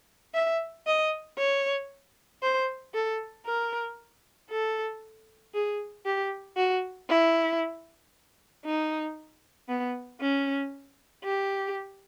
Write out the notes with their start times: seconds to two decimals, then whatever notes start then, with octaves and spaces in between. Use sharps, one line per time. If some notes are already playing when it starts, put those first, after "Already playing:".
0.34 E5
0.87 D#5
1.38 C#5
2.42 C5
2.94 A4
3.46 A#4
4.50 A4
5.54 G#4
6.05 G4
6.57 F#4
7.09 E4
8.65 D#4
9.69 B3
10.21 C#4
11.24 G4